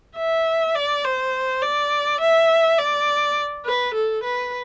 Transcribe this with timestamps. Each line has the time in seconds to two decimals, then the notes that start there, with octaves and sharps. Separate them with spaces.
0.17 E5
0.75 D5
1.04 C5
1.62 D5
2.21 E5
2.78 D5
3.66 B4
3.94 A4
4.24 B4